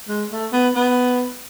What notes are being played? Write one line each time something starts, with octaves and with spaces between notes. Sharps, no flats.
G#3
A3
B3
B3